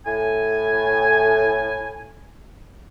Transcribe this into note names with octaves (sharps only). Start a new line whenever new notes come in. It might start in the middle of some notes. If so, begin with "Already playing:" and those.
A2 G#5